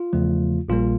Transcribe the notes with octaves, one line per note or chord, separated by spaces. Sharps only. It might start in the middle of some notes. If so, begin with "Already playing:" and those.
Already playing: F4
E2 C#3 F3 A3
A#1 A#2 G3 A#3 F4